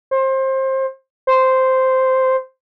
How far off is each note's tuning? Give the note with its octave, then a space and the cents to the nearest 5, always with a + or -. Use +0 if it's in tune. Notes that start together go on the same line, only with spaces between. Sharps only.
C5 +25
C5 -5